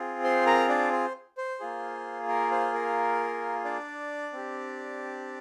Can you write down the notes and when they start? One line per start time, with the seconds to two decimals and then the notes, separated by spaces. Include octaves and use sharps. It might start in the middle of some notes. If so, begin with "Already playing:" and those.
Already playing: C4 F4 G#4
0.24 C5 C6
0.46 A#4 A#5
0.69 D4 D5
0.92 C5
1.37 C5
1.60 A#3 F4 G#4
2.28 A#4
2.51 C5
2.73 A#4
3.64 D4 D5
4.33 C4 G4